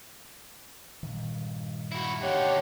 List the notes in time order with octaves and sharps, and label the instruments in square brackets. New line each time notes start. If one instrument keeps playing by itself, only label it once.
[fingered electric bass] G2 A#2 D#3
[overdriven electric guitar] E4 F#4
[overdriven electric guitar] D#2 D3 [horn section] G4 C#5 F#5